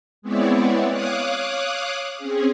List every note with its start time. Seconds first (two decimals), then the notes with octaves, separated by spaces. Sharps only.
0.22 G#3 B3 C4 E4 C#5 D5
0.89 C#5 F5 D6 D#6 F#6
2.17 C4 C#4 G#4